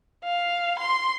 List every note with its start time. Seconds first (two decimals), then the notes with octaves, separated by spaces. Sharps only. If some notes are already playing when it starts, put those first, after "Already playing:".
0.24 F5
0.79 C6